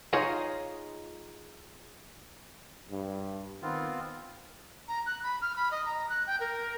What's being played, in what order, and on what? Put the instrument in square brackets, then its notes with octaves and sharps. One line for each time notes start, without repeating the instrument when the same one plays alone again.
[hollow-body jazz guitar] D#4 F4 G#4 C#5 D#5 F5
[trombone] G2
[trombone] D#3 [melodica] B3 C4 F4
[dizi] A#5
F#6
B5
F6
B5
D#5
A#5
F#6
G5
A#4